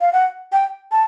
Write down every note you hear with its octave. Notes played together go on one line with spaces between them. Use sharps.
F5
F#5
G5
A5